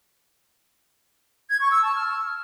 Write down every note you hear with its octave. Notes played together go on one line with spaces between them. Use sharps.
G#6
C#6
E6
A5
F6